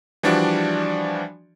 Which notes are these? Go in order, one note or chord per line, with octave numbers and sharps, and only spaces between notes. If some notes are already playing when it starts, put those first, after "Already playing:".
E3 F3 G3 D4 F#4 D5